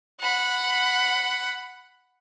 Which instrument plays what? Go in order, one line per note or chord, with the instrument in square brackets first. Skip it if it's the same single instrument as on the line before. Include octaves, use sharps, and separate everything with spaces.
[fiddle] F#5 B5